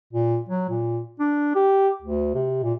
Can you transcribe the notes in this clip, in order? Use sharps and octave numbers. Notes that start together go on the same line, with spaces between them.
A#2
F#3
A#2
D4
G4
D2
C3
A#2